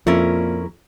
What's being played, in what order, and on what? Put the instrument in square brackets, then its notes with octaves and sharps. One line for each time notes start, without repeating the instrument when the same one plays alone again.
[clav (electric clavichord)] F2 [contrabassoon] A#2 [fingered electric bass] F3 [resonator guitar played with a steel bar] C#4 E4 A#4